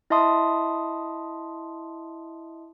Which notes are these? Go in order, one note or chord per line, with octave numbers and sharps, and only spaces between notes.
E4 D#5 E5 A5 C6 D#6